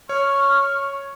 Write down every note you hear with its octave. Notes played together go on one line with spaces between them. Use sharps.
C#5 C#6 F6